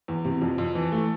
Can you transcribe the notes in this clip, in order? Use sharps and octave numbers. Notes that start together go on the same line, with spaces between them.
E2
C3
F2
F2
E3
A3